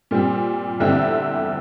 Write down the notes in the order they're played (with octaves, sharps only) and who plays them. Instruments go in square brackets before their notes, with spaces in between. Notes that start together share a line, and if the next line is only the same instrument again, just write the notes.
[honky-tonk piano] A#2 G3 C4
E2 D3 G3 C4 E4